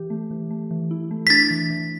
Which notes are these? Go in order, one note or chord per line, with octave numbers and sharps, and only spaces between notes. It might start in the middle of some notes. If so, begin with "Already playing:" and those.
Already playing: E3 G4
A3
E3
A3
E3
E4
A3
B6
D4 A6
E3
E3